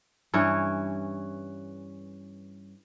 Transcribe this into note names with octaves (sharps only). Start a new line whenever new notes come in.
G2 E3 C#4 C#5